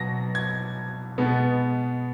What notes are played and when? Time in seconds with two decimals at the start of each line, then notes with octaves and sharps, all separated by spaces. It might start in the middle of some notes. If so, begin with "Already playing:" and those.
Already playing: B2 F#3 B3 A#6
0.35 G#6
1.18 B2 G#3 B3